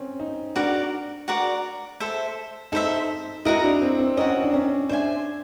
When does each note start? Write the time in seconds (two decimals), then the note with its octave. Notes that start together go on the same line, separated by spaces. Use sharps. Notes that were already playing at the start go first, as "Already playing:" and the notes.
Already playing: C4 C#4
0.20 D#4
0.55 D4 F#4 A#4 D5
1.28 F#4 A#4 D5
2.00 A4 C5 E5
2.72 D#4 A4 C5 E5
3.45 E4 F#4 A#4 D#5
3.64 D4
3.82 C4
3.99 C4
4.17 C#4 F#4 A#4 D#5
4.43 D4
4.54 C#4
4.89 D4 C5 E5 G#5